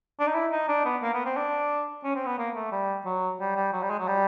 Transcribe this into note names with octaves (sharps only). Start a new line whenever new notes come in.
D4
D#4
E4
D#4
D4
B3
A#3
B3
C4
D4
C#4
C4
B3
A#3
A3
G3
F#3
G3
G3
F#3
G3
G#3
F#3
G3